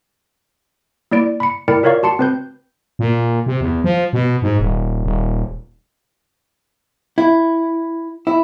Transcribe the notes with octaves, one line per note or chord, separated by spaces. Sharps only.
A#3 E4 D5 D7
B5 C#7
E4 A#4 D5 G5 C#7
F4 A#4 C#5 D5 F5 C#6
F#4 A5 C6 C#7
C4 B4 G6
A#2
C3
E2
F3
B2
G#2
D#1
D#1
E4
E4